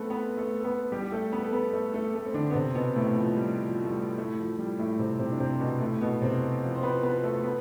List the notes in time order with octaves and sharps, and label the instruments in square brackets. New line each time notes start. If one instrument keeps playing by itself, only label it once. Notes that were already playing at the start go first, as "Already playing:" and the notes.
Already playing: [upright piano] A3 B3 C4 A4 B4
B3 B4
A3 A4
A4
B3 B4
G3 G4
G4
A3 A4
B3 B4
A4
B3 B4
A3 A4
A3 A4
A3 A4
C4
D3 D4
B3
C3 C4
B2 B3
A2 A3
F3
G3
F3
A3
G3
A2 A3
F3
F3
G3
A2 A3
C3 C4
C3 C4
D4
C3 C4
B2 B3
A2 A3
B2 B3
C3 C4
F3 F4
C5
B3 B4
B3 B4
A3 A4
B3 B4